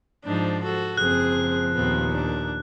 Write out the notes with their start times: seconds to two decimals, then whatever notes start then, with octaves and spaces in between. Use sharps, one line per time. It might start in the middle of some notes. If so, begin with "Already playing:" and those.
0.25 G#2 F3 D4 D#4
0.63 F#4 A4
0.97 F#1 F3 C4 G#4 F#6
1.75 D#2 A#2 B3 C4
2.11 D4